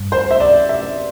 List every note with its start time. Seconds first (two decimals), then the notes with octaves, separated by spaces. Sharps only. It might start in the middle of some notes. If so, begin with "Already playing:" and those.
Already playing: G2
0.12 C5
0.31 E5
0.40 D5
0.69 E5